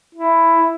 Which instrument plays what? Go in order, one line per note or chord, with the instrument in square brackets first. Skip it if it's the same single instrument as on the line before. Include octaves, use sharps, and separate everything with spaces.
[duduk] E4